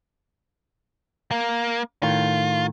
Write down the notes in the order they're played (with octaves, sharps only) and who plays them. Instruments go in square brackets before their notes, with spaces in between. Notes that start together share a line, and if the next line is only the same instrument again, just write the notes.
[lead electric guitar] A#3
[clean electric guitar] A2 D#3 [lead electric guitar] F4